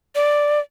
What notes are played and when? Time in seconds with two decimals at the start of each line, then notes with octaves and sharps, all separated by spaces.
0.15 D5